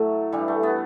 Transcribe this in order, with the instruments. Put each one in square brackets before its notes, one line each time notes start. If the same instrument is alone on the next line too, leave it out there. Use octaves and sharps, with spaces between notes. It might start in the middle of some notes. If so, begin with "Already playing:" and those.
Already playing: [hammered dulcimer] A2 F#3 A3
G2 E3 G3
A3
B3